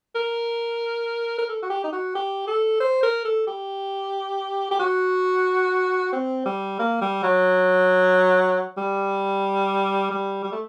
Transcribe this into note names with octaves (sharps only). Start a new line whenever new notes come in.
A#4
A#4
A4
F#4
G4
D#4
F#4
G4
A4
C5
A#4
A4
G4
G4
F#4
C4
G3
A#3
G3
F#3
G3
G3
G3
A3